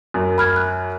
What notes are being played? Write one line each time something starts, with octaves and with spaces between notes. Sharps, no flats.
F#2
B5 F6 G#6
F#6